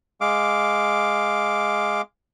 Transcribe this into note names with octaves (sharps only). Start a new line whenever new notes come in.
G#3 F5 D6